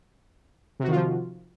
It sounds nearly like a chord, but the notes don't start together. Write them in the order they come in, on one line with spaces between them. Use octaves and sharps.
C3 F#4 D#3 F4 F3